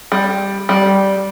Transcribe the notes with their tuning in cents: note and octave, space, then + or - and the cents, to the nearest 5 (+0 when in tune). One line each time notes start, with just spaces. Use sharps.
G3 +5
G3 -10